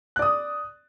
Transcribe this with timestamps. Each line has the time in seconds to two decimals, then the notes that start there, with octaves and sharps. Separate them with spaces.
0.16 F#6
0.19 D5
0.22 D#6